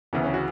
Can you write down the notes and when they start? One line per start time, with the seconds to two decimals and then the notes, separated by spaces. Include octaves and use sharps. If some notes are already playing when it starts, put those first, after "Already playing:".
0.13 D2 C#3 E3 B3
0.24 C#4
0.34 F#4